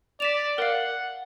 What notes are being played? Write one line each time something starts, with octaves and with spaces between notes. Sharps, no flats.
D5 B6 E7 F7
A#4 D5 F5 F#5